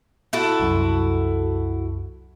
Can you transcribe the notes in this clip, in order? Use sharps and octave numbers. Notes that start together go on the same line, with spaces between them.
E4 F#4 A4
C2 F#2